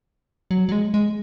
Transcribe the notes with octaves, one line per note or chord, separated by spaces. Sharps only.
F#3
F#3
G#3
G#3